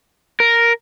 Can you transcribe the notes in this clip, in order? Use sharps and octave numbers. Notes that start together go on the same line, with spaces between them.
A#4